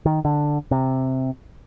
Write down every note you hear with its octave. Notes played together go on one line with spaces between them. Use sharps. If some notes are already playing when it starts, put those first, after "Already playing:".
D#3
D3
C3